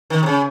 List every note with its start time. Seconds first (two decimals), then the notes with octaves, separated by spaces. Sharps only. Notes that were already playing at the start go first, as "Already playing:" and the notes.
0.10 D#3
0.23 C3
0.26 C#3